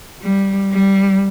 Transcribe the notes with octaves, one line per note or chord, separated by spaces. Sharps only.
G3
G3